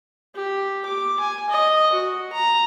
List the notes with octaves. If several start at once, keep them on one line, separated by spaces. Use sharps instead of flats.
G4
D6
G#5
D#5
F#4
A#5